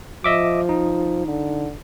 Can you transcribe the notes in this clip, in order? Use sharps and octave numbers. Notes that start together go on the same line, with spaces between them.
F3 D#5 E5 D6
D#4
D3